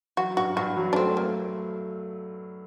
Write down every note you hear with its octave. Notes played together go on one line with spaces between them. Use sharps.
F#3 F#4
G2 F#4
G2 F#4
F#3
D4
A3 C4
A3 A#3